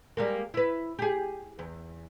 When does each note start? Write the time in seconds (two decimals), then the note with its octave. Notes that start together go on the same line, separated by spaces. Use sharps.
0.17 G3 G#3 A#3
0.54 E4 B4
0.99 G4 G#4
1.59 E2